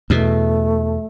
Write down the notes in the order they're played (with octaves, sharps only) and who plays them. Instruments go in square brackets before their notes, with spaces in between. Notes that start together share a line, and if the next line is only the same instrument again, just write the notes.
[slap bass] E2 B2 [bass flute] A3